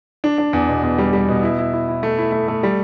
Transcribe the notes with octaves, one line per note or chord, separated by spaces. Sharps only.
D4
D4
E2
B2
E2
G3
G3
B2
E4
E4
E4
E4
A3
E4
A3
A3
G3